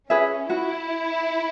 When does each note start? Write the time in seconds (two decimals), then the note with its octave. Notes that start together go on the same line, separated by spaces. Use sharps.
0.10 C#4 G#4 B4 E5
0.49 E4 F#4